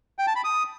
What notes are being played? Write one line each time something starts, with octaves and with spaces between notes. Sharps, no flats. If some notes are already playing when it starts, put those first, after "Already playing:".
G5
A5
B5
D#6